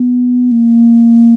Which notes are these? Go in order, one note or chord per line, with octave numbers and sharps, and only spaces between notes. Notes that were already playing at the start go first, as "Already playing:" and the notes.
Already playing: B3
A#3